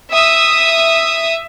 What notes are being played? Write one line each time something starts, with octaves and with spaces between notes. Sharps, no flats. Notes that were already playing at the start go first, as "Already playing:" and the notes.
E5 D#6